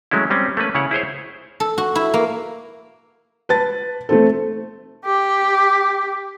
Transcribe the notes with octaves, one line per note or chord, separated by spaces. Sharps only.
F#3 G#3 A3 C#4 E4
G3 C4 C#4
A3 A#3 C#4 B4
C#3 E4 C#5 F#5
E4 G#4 C5 C#5
A4
F#4
E4
A#3
B4 A5 A6
A3 C4 A4
G4